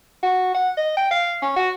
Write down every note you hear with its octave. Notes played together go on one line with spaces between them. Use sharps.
F#4
F#5
D#5
G5
F5
C#4
F#4